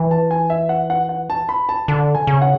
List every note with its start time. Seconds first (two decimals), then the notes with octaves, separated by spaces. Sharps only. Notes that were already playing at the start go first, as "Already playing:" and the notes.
Already playing: E3
0.11 A5
0.31 G#5
0.50 E5
0.69 F#5
0.90 F#5
1.09 F#5
1.30 A5
1.49 B5
1.69 A5
1.88 D3 A5
2.15 G#5
2.27 C#3
2.42 F#5